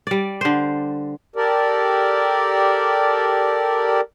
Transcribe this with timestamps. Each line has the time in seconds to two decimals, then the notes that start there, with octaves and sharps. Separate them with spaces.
0.07 G3 D5
0.41 D3 C5
1.36 G4 A4 A#4 D5